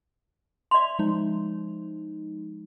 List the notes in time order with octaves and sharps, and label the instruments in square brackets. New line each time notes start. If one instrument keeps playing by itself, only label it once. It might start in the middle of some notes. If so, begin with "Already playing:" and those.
[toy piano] D5 C6 [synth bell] E5 F7
[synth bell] F3 G#3 D#4